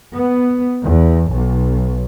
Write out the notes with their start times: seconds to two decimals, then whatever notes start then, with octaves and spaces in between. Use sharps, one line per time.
0.14 B3
0.83 E2
1.30 B1